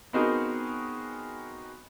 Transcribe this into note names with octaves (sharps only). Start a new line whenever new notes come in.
B3 C4 D#4 F#4 G#4 A#4